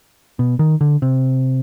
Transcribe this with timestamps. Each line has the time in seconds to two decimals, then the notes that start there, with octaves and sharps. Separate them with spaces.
0.39 B2
0.59 D#3
0.81 D3
1.02 C3